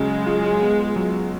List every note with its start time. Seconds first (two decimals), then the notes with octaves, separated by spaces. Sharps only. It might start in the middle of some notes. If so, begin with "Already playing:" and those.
Already playing: C#3 F#3 G#3 C#4
0.27 F4
0.62 B3
0.96 F#3